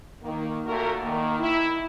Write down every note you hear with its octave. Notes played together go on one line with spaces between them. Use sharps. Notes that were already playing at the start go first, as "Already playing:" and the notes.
D#3 A#3
A#2 A3 F#4 A#4
D#3 A#3
E4